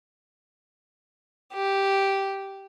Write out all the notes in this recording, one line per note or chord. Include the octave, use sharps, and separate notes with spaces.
G4